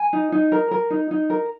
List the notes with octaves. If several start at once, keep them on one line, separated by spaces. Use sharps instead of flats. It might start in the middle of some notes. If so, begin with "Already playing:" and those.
Already playing: G#5
D#4
D#4
A#4
A#4
D#4
D#4
A#4